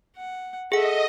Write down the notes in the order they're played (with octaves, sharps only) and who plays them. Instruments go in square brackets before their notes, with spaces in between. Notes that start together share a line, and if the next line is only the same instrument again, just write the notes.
[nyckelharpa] F#5
[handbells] G#4 F#5 [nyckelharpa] A4 E5 [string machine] D#5